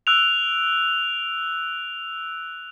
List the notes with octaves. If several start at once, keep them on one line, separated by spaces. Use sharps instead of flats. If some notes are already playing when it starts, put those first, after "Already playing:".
E6 F#6 D7 F7